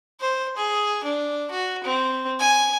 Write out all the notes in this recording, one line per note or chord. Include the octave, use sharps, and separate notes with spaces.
C5
G#4
D4
F#4
C4
G#5